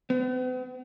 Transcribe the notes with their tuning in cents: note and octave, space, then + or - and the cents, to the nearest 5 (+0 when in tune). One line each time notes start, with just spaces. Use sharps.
B3 +45